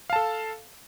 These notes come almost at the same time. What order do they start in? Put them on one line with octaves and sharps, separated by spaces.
F5 A5 A4